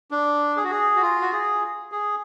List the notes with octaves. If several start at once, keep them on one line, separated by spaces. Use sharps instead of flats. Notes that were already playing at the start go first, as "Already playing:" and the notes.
D4
G#4
F#4
G#4
F#4
F4
F#4
G#4
G#4